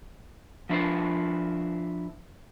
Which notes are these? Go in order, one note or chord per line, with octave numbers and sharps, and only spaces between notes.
F3 D4 E4 F4 A#4 C5